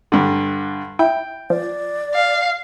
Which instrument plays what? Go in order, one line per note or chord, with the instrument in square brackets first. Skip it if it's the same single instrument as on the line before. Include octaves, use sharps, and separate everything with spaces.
[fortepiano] G2 D3
[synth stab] E4 [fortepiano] G5
[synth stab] F3 [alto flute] D5
[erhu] F5